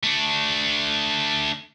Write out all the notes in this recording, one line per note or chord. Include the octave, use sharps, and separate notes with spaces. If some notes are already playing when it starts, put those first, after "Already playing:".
A3 D4